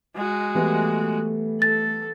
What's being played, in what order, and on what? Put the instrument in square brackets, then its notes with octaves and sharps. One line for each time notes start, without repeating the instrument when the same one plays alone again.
[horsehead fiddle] G#3 F#4
[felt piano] E3 G3 B3 [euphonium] A3
[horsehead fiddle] A4 [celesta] A6